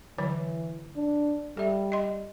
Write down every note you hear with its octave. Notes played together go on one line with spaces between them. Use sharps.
D3 E3 F#3 C#5
D4
G3 A4 E5
D#5 C6